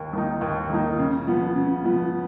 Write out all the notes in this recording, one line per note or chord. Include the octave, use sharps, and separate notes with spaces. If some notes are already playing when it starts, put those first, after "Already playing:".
Already playing: D#2 D#3 A#3
D#3 A#3 D#4
D#2
D#3 A#3 D#4
C#3
F3 B3
C#3
F3 B3